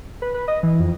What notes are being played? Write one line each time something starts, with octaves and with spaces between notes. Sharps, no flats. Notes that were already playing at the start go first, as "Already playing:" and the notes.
B4
B4
D#5
E3
F2